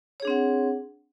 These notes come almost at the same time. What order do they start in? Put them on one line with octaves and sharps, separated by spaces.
C#5 G#4 D4 C4 F#5